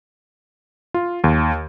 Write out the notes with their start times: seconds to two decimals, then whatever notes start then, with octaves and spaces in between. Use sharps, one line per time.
0.94 F4
1.24 D#2